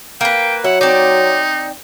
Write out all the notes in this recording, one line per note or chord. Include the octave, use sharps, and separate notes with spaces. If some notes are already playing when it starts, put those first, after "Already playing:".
A#3 B4 G5
F#3 E4 F#5
C4 D#4 D5